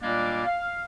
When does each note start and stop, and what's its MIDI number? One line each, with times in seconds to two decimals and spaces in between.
0.01 0.44 46
0.01 0.44 55
0.01 0.44 56
0.01 0.44 58
0.01 0.44 62
0.45 0.83 77